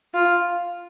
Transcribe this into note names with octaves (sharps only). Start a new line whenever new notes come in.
F4